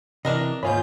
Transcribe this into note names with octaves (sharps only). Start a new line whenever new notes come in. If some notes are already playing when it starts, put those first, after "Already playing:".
C3 E3 D4 A#4 D#5
D#2 G#2 F4 C#5 D#5 G#5 B5 G6